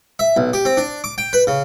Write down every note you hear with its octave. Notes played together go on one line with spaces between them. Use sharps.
E5
B1
G4
C4
D4
D6
G5
B4
C#3